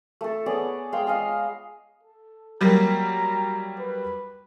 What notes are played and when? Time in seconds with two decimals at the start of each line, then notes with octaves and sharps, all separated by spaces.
0.21 A3 A4
0.46 B3 G#4 C#5 D5
0.92 G#3 F5 G5
1.07 G#4 D#5 F5
2.03 A4
2.61 F#3 G3 A#3 A#5
3.79 B4